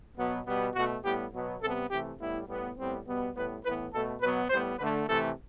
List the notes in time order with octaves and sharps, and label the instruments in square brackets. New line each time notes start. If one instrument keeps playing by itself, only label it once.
[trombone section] B2 F#3 B3
B2 G3 B3
B2 A3 F#4
A2 G3 B3 G4
B2 F#3 B3
C3 G3 B3 A4
C3 E3 A3 G4
A2 G3 B3 E4
A2 G3 B3
A2 G3 B3 C4
B2 G3 B3
A2 G3 B3 B4
A2 E3 B3 B4
B2 A3 A4
B2 F#3 B3 B4
A2 G3 B3 C5
D3 A3 B4
C3 E3 A3 A4